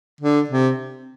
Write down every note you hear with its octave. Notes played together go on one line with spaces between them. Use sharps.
D3
C3